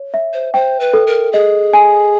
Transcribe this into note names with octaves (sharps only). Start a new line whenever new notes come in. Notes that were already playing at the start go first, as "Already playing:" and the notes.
Already playing: C#5
E5
C5
C5 G5
B4
A4
A#4
G#4 D#5
G#5